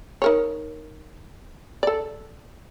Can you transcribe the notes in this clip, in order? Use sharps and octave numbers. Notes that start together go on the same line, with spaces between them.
D#4 A#4 C#5
A4 D5